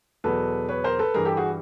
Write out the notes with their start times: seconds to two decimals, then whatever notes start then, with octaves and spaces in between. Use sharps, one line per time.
0.24 E2 B2 F#3 A4 B4
0.69 B4 C#5
0.84 A#4 C5
0.99 A4 B4
1.14 G2 E3 G#4 A#4
1.25 G4 A4
1.37 F#4 G#4